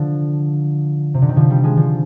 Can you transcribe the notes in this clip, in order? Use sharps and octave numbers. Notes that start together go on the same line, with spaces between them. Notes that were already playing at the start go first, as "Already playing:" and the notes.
Already playing: D3 F3
C3
D3
D#3
D3 F3
D#3 G3
F3 G#3
D3 F3